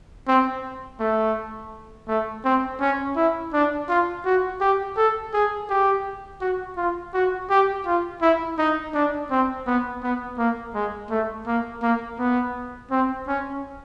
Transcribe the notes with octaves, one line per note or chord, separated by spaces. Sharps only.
C4
A3
A3
C4
C#4
E4
D4
F4
F#4
G4
A4
G#4
G4
F#4
F4
F#4
G4
F4
E4
D#4
D4
C4
B3
B3
A#3
G#3
A3
A#3
A#3
B3
C4
C#4